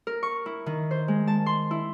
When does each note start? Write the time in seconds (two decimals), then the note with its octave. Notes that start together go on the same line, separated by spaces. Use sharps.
0.07 A#4
0.23 C#6
0.46 E4
0.66 D#3
0.91 C5
1.08 G#3
1.28 A5
1.46 C6
1.71 E4